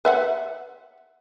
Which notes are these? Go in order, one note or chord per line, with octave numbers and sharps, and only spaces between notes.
B4 E5 F#5